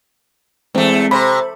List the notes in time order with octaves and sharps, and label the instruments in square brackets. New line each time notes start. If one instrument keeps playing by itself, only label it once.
[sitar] E2 A3 [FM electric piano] G#3 C4
[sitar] C3 [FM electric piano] C5 B5